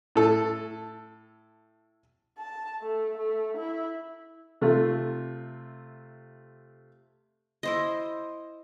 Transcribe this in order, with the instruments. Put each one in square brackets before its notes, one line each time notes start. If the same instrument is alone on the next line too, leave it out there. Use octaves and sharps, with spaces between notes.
[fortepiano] A2 A4
[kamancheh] A5
A3
A3
E4
[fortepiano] C3 A3 F4
[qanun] E4 C5 D#5